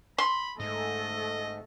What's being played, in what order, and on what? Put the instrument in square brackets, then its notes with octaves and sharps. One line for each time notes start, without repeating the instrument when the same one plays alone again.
[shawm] B5 [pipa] C6
[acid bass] G#2 [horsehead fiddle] A3 A4 [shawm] D#5